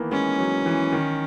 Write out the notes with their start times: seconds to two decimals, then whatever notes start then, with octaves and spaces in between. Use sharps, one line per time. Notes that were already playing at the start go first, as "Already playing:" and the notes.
Already playing: D#3 E3 A#3 B3
0.11 G#3 C#4
0.38 F#3
0.66 E3
0.93 D#3